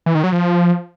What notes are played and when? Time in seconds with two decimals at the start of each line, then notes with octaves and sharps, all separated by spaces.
0.06 E3
0.15 D#3
0.24 F#3
0.32 F3